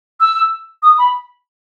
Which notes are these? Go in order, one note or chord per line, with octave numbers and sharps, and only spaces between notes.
E6
D#6
B5